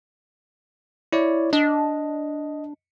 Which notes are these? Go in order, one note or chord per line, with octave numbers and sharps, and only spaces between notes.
E4 C#5 D5
D4 D#5